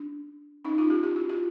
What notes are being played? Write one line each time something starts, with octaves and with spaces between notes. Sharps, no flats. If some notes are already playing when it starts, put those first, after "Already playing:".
Already playing: D4
C#4 D#4
D#4 F4
F4 G4
F4 G4
E4 F#4
F4 G4